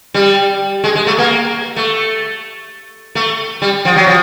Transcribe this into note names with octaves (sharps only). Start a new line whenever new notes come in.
G3
G#3
G#3
A3
A#3
A3
A3
G3
F3
F#3
F3